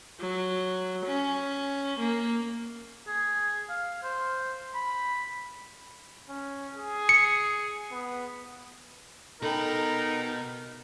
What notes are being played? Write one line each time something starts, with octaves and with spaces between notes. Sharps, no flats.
F#3
C#4
A#3
G#4
F5
C5
B5
C#4
G#4
C#7
B3
B2 D#4 A4 A#4 G5 B5